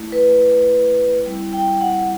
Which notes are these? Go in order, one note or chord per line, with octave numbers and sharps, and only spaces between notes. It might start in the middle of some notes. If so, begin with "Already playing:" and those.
Already playing: A3 E4
B4
G3 C4 E4
G5
F#5